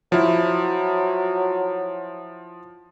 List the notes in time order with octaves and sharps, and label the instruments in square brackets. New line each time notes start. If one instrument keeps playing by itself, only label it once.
[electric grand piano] F3 E4 [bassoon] F#3